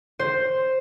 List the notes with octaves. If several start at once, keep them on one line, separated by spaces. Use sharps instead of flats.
C5